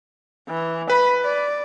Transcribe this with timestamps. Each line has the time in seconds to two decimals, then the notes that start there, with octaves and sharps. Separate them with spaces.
0.48 E3
0.90 B4 B5
1.24 D5